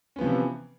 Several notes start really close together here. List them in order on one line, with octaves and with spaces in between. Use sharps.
C#4 B3 F3 C3 E3